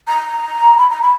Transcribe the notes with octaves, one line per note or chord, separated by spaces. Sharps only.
A#5
B5
A#5
B5